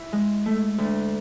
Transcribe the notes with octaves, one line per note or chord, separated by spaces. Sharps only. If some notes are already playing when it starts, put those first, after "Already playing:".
Already playing: E4
G#3
A3
D2